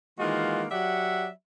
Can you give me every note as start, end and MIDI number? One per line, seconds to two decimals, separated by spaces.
0.19 0.65 51
0.19 0.65 52
0.19 0.65 56
0.19 0.65 58
0.19 0.65 65
0.19 0.65 66
0.71 1.28 54
0.71 1.28 67
0.71 1.28 74
0.71 1.28 76
0.71 1.28 78